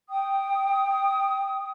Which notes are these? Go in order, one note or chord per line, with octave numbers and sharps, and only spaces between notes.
G5 D#6